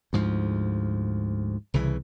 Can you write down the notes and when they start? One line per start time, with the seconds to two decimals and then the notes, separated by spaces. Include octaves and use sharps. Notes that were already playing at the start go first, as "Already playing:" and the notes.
0.13 D2 G#2 F3
1.74 C2 C#3 E3